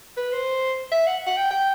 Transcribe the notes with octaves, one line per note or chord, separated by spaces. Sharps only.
B4
C5
E5
F#5
F#5
G5
G5